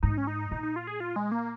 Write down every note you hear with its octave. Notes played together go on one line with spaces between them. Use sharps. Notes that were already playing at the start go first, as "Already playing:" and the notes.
G#2 D#4
C#4
D#4
A#2 D#4
D#4
F4
G#4
F4
G#3
A#3